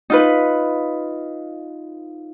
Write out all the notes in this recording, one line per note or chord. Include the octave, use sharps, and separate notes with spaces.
D#4 F4 B4